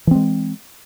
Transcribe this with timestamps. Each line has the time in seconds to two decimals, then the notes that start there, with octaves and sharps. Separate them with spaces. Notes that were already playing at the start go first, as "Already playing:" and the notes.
0.07 E3
0.11 C4
0.15 G#3